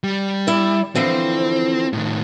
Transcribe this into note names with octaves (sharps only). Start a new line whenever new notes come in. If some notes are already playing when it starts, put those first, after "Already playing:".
G3
E4 D5
D3 E3 F3 C4
A2 D#3